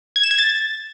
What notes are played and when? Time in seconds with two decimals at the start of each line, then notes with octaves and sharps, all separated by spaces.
0.16 G#6
0.23 E7
0.31 G#6
0.38 A6